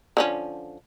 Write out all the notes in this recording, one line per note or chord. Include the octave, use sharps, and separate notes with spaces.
D3 F3 C#4